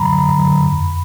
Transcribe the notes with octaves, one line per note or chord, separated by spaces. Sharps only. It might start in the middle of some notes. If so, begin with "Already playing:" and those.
Already playing: F#2 D3 F#3 A#5 B5
F#2
D3 F#3
F2